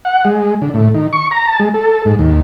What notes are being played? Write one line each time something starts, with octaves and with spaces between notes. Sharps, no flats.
F#5
G#3
D3
A2
D#3
C#6
A#5
A5
G#3
A4
G#2
D#2